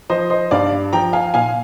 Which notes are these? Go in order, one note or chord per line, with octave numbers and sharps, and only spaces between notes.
F3 C5 D#5
C5 D#5
G2 D5 F5
F3 G5 A#5
F5 G#5
A#2 F5 G#5